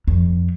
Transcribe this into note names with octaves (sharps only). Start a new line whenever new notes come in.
F2